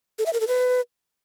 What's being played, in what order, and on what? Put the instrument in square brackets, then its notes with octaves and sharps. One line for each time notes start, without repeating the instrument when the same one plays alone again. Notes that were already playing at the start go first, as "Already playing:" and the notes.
[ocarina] A4
E5
A#4
A4
B4